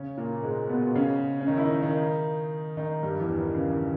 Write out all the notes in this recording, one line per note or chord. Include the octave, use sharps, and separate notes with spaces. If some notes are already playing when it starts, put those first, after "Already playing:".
Already playing: C#3 C#4
A#2 A#3
G#2 G#3
B2 B3
C#3 C#4
C#4
D#3 D#4
E4
D#3 D#4
D#3 D#4
D#3 D#4
G2 G3
E2 E3
D#3
C#3
D#3